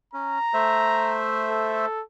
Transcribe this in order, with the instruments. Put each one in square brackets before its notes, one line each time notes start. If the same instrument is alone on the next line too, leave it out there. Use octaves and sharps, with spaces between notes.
[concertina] C#4 [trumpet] A#5
[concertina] A3 C5 E5
[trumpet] A4